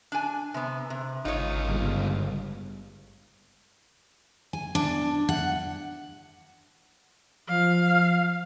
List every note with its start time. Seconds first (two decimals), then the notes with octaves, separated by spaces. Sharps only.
0.12 D4 G#5
0.54 C3 B3
0.90 C3
1.25 G#1 C#2 D#4 F4 C#5
1.64 G1 G#3
4.53 G#5
4.75 D4
5.29 F#5
7.48 F3 F5